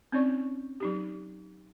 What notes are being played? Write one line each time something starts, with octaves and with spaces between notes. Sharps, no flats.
C4 C#4 D#4 C#5 D5 C#6
F#3 D#4 G4